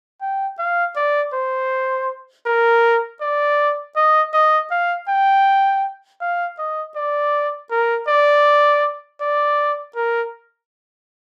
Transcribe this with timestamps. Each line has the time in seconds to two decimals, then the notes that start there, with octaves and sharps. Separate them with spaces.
0.21 G5
0.59 F5
0.96 D5
1.34 C5
2.46 A#4
3.21 D5
3.96 D#5
4.34 D#5
4.71 F5
5.08 G5
6.21 F5
6.58 D#5
6.96 D5
7.71 A#4
8.08 D5
9.21 D5
9.96 A#4